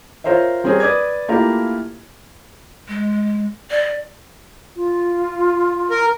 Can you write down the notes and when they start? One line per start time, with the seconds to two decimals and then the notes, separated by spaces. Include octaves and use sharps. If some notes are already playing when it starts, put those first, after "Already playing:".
0.24 F4 A#4 C5 C#5 E5
0.64 G3 C4 C#4 G#4 A#4
0.80 B4 D5 D6 D#6 G#6
1.28 A3 A#3 E4 F4 G4 A#4
2.89 G#3
3.71 D5
4.76 F4
5.91 A#4